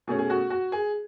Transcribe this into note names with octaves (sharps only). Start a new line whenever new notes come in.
B2 A3 C#4 G#4
G#4
F#4
F#4
G#4